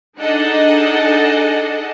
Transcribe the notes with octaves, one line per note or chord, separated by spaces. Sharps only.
D4 D#4 G#4 A4 D#5 F#5